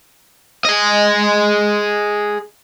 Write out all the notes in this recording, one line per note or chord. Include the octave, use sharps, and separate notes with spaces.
G#4 D#5